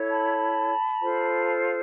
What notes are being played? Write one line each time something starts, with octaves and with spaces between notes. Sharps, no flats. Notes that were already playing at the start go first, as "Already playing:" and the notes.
Already playing: E4 A4 C#5
A5 B5
F4 A4 C5